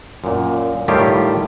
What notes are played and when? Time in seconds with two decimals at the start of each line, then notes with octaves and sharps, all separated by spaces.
0.24 F#2 A#2
0.88 A2 D#3 G3 E4 F4 G4